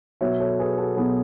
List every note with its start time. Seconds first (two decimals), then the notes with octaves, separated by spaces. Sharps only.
0.21 B2 F#3 B3 C#5 E5
0.39 A4 C#5
0.59 G#4 B4
0.78 F#4 A4
0.96 B2 F#3 B3 G#4